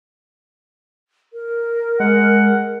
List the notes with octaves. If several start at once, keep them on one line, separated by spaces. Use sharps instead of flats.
A#4
G#3 F#5